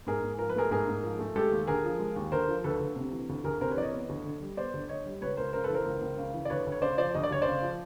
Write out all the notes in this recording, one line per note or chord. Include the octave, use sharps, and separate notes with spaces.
G#2 G#4 A#4
G#2
F3 A#4
B4
A3 G#4 A#4
G#2 G#4 A#4
G#2
F3
A3
G#3 G4 A4
D#2
D3 G#4 A#4
F3
G#3
D#2
D3 A#4 C5
F3
D2 A4 B4
D2
C3
E3
D2
D2 G#4 A#4
C3 A#4 C5
B4 C#5
E3 D5
C#5 D#5
B3
D2
D3
G3
B3 C5 D5
D2
D3 C#5 D#5
G3
C#2 B4 C#5
C#2 A#4 C5
C#3 A#4 C5
A4 B4
E3 A#4 C5
C#2
C#2
C#3
E3
D5
D2 B4 C#5
D2
C#5
C#3 C5 D5
F3 C5 D5
D2 D#5
D5
D2 C#5
C#3 C5 D5
F3